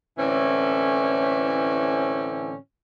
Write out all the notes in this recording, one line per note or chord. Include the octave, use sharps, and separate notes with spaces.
A2 D3 E3 C4 C#4